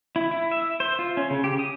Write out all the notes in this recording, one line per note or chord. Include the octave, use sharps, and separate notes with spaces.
E4
E4
E5
C5
F4
C#4
C#3
G4
D#6